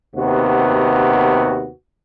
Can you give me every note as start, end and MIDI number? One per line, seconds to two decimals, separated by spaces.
0.15 1.68 39
0.15 1.68 48
0.15 1.68 59
0.15 1.68 66